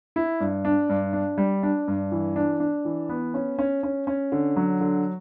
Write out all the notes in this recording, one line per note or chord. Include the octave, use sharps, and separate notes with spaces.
E4
G2
D4
G2
D4
G3
D4
G2
E3
D4
D4
E3
B3
C#4
C#4
C#4
C#4
D3
F#3
D3